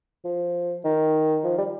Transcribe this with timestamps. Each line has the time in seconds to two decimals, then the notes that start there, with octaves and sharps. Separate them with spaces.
0.25 F3
0.84 D#3
1.44 F3
1.58 G3